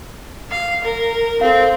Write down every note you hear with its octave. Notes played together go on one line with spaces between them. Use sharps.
F5
A#4
C4 A4 F5